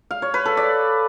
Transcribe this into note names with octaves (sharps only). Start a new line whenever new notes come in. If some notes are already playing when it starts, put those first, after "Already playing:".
F5
C#5
B4
A4
D5